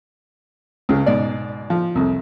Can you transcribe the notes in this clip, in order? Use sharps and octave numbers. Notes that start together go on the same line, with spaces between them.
C#2 C#3
G#2 B2 D5
F3
C2 F2